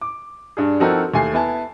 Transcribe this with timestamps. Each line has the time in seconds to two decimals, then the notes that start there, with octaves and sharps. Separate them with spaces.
0.01 D6
0.57 G2 D4 G#4
0.80 F3 C4 D#4 F#4 A4 A#4
1.14 D#2 A3 G#5 C7
1.33 B3 E4 G#5 A5